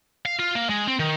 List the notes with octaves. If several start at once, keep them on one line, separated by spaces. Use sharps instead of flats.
F5
F4
A#3
G#3
C4
D#3